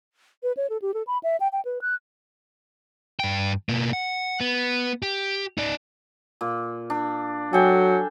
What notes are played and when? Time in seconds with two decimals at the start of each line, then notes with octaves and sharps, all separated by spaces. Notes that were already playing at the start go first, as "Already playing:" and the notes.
0.43 B4
0.57 C#5
0.70 A4
0.82 G4
0.94 A4
1.07 B5
1.23 E5
1.40 G5
1.52 G5
1.65 B4
1.82 F#6
3.20 G2 G5
3.69 B2 A#3
3.93 F#5
4.40 B3
5.02 G4
5.58 D#4 D5
6.41 A#2
6.90 D4
7.53 F#3 A4 G5 G#5